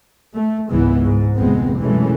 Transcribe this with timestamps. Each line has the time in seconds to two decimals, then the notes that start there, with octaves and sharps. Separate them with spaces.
0.34 A3
0.69 G#1 C#2 G#2 E3 G#3 B3
1.00 G#2
1.37 F1 D2 G#3 B3 C4
1.79 F#2 B2 E3 G#3 A3 C#4